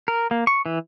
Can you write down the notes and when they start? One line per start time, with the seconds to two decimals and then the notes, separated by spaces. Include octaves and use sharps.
0.08 A#4
0.31 A#3
0.47 C#6
0.66 E3